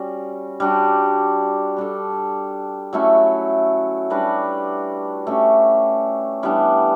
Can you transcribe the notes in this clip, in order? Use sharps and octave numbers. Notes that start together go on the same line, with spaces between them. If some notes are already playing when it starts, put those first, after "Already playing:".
Already playing: G3 C#4 F#4
G3 D4 F#4
G3 D4 A4
F#3 A3 C#4 E4
G3 D4 F#4 B4
A3 C#4 G4
E3 G3 B3 D4